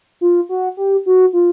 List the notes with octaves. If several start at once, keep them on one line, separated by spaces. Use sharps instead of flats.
F4
F#4
G4
F#4
F4